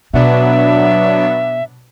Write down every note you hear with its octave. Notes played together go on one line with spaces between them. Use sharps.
B2 F#3 B3 D4 E5